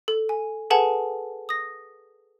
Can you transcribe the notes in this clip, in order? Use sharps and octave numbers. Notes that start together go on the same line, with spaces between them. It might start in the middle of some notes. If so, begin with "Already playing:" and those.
A4
G#5
G#4 A4 B4 F#5 G#5 A5
D#6 A#6